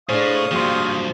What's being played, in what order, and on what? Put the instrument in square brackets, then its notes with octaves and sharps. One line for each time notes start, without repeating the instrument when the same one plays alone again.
[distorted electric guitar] A2 [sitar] D4 G#4 [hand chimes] C5 [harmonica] F5 C#6 D#6
[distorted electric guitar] G2 F3 [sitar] C3 [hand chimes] A#3 F#4 C6